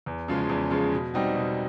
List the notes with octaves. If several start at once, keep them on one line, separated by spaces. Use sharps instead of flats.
E2
C#3 F3 G#3
E2
C#3 F3 G#3
B2
G3 C4 D#4 F#4
B2